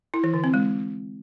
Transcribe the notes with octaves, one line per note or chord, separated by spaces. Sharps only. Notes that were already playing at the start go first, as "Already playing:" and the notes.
E4
E3
D3
C4
G#3